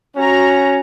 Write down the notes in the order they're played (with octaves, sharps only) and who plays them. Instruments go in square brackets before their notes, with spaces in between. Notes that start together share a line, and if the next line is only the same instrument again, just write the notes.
[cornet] C#4 [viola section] F#4 A#5